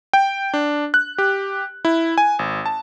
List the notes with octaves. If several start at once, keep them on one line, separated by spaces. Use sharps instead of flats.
G5
D4
F#6
G4
E4
G#5
G#1
A5